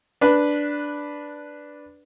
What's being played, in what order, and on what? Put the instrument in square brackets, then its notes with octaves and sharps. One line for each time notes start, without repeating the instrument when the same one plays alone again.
[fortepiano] D4 B4